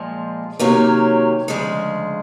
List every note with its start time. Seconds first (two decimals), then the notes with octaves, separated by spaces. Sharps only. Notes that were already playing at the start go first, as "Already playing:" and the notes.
Already playing: A#2 F3 G#3
0.59 C3 D#3 F#3 A#3 C#4
1.48 D2 C#3 F3 G#3